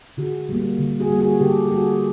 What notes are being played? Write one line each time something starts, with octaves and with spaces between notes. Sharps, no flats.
D3 F#4 G#4
G3 A#3
D3
F#4 G#4
G3 A#3
F#4 G#4
D3 G4 A4
A4
G3 A#3 F#4 G#4